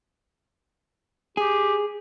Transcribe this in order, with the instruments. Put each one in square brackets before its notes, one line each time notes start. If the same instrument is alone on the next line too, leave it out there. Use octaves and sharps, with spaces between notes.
[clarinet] G4 [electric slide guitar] G#4